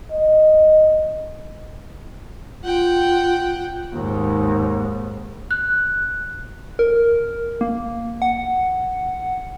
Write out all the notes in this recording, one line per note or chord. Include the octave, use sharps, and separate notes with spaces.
D#5
F4 F#5 G5
D#2 G#2
F#6
A#4
A#3
F#5